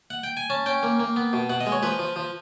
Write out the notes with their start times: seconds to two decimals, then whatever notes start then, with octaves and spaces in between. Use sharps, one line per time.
0.10 F#5
0.24 G5
0.37 G#5
0.50 C#4 A5
0.66 C#4 G5
0.83 A#3
1.00 A#3
1.16 B3
1.33 B2
1.49 B2 F#5
1.60 D#5
1.66 G#3
1.72 C#5
1.82 F3 B4
1.99 F3
2.16 F3